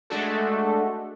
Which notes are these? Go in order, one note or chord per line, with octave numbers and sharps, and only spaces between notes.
G#3 A3 D4 F#4 A4